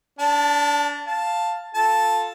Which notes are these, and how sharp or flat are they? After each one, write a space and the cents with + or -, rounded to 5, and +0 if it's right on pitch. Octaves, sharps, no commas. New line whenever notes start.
D4 -30 A5 +5
F5 +0 A5 +5
F4 +0 A4 +0 A5 +0